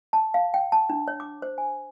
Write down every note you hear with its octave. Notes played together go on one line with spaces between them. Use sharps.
A5
F5
G5
A5
D4
C#5
D6
C5
G#5